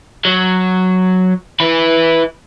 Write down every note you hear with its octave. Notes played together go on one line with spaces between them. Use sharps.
F#3
E4 B4